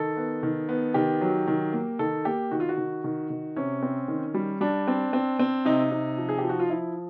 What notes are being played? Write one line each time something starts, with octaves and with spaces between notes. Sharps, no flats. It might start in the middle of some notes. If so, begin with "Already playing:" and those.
Already playing: D#3 A4
B3
D#3
B3
D#3 G4
F#3
D#3
A#3
D#3 A4
A#3 G4
D#3 F#4
F4
F#4
D#3
D#3
D#3
C3 C#4
C4
D#3
G3
G3 D4
C4
C4
C4
C3 D#4
C3
F3
G#4
G4
F3
F#4
F4
F3 E4